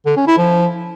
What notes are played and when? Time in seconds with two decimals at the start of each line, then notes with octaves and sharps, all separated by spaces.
0.06 D3
0.17 C#4
0.27 E4
0.38 F3